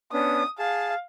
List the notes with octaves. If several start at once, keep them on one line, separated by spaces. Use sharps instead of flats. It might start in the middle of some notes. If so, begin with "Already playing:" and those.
B3 C#4 D4 D#6
G#4 F5 A5